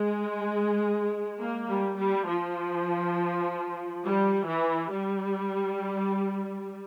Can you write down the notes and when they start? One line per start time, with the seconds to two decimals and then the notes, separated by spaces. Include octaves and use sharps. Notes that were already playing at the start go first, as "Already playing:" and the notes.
Already playing: G#3
1.40 A#3
1.68 G3
1.98 G3
2.28 F3
4.05 G3
4.48 E3
4.92 G3